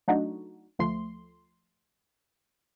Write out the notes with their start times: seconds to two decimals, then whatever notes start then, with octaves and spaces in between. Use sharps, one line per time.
0.08 F#3 A3 D4 D#4 F#4
0.79 D2 F3 A3 C6